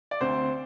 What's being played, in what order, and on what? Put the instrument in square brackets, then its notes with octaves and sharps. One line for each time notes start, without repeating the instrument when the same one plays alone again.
[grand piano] D5
D2 C4 C5